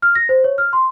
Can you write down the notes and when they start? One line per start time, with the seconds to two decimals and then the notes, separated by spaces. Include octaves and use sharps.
0.02 F6
0.15 A#6
0.29 C5
0.44 C#5
0.58 F6
0.73 C6